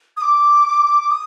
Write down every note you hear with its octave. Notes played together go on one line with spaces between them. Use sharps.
D#6
D6
D#6